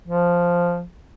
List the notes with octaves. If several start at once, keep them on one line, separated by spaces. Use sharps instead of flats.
F3